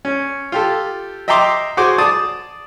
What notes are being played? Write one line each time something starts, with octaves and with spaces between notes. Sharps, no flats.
C#4
F4 G4 A4
D#5 E5 G5 A#5 C6 D6
F#4 G#4 C5 D6
D5 A5 D6 D#6